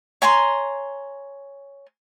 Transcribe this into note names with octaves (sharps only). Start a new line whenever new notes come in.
C#5 G#5 A#5 C6